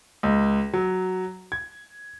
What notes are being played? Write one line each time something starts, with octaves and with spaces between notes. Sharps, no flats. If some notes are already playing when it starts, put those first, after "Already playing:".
C#2
F#3
G#6